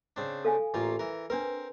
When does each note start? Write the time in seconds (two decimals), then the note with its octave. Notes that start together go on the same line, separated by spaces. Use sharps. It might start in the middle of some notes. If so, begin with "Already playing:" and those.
0.16 C#3 C4 D4
0.45 A4 F5 G#5
0.74 A1 A#3 F4
0.99 E3 A#4
1.30 C4 D4 A#4 B4